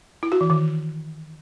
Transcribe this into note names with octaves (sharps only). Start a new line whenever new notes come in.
E4
F#4
E3
D#3